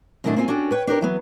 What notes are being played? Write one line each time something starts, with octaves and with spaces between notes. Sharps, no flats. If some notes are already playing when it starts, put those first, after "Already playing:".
F#2 A2 D#3 A3 D4 F#4
A#3 C4 C#4 F4 G#4 G#5
C#4 D4 F#4 G4 A4
B4 C#5 G5
D4 G4 A#4 C#5
E3 F#3 B3